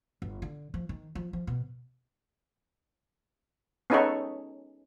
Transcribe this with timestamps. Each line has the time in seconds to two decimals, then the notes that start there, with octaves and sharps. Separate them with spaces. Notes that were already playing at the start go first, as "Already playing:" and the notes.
0.22 G1
0.42 D3
0.74 F3
0.89 D#3
1.15 F3
1.33 F3
1.47 B2
3.90 B3 C#4 D#4 G#4 A4 C#5